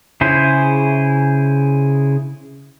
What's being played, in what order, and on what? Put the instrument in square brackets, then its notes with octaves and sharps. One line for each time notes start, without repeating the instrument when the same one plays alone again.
[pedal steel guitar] C#3 E4 G#4 C5